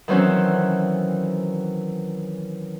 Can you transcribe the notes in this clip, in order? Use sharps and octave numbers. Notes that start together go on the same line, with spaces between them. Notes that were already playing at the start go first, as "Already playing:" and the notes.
D#3 E3 F#3 C4 C#4